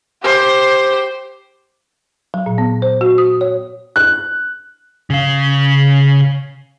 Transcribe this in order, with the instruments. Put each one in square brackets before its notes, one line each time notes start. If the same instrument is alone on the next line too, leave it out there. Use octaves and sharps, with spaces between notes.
[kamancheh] G4 C5
[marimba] F#3
A#2
B3
C5
F#4
D#6
C#5
[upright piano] F#6
[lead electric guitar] C#3 F5